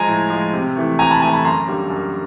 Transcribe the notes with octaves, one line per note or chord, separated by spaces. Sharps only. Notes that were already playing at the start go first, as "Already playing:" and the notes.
Already playing: F3 G#3 G#5 A#5
A2
F3 G#3
C3
E3 A3
C3 G#5 A#5
A5 B5
E3 A3 G#5 A#5
A5 B5
F#2 A#5 C6
D3 G3 A#3
F#2